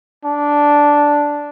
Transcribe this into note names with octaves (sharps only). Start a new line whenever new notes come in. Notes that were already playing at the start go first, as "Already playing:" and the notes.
D4